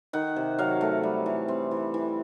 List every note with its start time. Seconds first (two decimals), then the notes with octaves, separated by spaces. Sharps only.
0.13 D#3 F#5
0.36 C3
0.59 F#3 F5
0.81 A3
1.03 G3
1.26 E3
1.48 C4
1.71 E3
1.94 E3